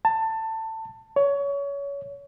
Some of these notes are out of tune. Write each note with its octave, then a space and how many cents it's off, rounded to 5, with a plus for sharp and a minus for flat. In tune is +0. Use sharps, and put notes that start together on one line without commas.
A5 +20
C#5 +25